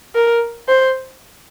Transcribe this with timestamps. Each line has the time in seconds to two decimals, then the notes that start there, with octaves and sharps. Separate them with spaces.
0.15 A#4
0.68 C5